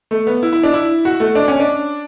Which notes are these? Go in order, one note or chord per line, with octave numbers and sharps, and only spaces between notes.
A3
B3
E4
E4
D4
E4
F#4
A3
D4
C#4
D4